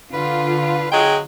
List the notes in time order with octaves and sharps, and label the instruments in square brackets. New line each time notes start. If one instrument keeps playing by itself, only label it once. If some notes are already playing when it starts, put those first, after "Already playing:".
[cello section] D3 F4 [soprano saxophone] B4
[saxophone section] F#3 G#3 [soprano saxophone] G5